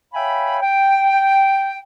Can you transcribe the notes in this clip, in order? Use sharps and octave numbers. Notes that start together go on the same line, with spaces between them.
C#5 E5 F5 G5 G#5 B5
G5